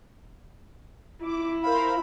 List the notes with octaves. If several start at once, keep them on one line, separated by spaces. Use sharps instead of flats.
E4 D6
A#4 C5 F5 B5